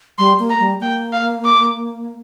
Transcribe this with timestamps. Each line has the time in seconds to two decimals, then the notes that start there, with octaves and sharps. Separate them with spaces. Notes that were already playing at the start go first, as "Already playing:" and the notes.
0.18 G3 C6
0.39 A#3
0.50 A#5
0.60 G3
0.81 A#3 G5
1.13 F5
1.45 D6